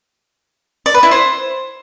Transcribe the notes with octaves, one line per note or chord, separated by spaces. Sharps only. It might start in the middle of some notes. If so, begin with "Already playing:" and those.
D5
B4
E4
C5